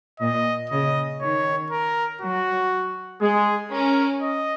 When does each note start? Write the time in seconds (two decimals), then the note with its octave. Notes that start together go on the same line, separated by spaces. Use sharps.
0.20 A#2 D#5
0.70 C#3 D#5
1.21 D#3 C#5
1.71 A#4
2.21 F#3 F#4
3.21 G#3 G#4
3.72 C#4 A#4
4.22 D#5